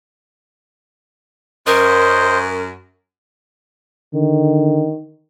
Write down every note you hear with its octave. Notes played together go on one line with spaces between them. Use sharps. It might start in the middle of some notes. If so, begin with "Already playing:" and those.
F#2 A#4 C5 D#5
D3 D#3